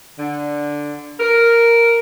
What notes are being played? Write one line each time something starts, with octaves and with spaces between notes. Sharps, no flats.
D3
A#4